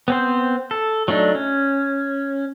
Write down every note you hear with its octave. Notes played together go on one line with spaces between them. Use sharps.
B3 C4 C5
A4
F#3 A3 D4 D#4
C#4